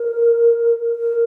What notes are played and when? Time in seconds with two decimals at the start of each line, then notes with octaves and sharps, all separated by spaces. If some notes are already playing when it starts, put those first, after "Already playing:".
Already playing: A#4
0.96 A#4